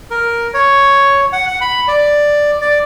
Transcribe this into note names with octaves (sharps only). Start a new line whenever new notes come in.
A#4
C#5
F#5
F#5
B5
D5
D5